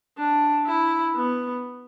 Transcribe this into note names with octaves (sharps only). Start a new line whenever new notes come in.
D4
E4
B3